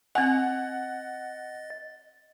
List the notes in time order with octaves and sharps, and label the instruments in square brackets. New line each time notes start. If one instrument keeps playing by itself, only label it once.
[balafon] C4 G#5 [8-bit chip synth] D#5 A6 [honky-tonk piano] F#5